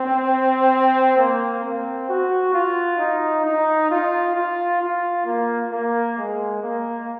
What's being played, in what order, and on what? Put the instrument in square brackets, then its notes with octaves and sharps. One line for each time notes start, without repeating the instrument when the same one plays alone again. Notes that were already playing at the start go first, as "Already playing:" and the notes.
Already playing: [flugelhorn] C4
A#3
C4
F#4
F4
D#4
D#4
F4
F4
F4
A#3
A#3
G#3
A#3